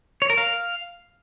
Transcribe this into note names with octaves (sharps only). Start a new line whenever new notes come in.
C#5
A#4
F5